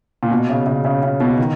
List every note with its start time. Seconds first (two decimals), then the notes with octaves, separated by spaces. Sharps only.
0.23 A#2
0.31 B2
0.49 C#3
0.67 C#3
0.85 C#3
1.03 C#3
1.20 B2
1.38 D#3